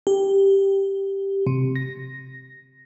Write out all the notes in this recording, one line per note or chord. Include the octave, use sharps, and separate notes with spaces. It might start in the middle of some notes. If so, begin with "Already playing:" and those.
G4
C3
A#6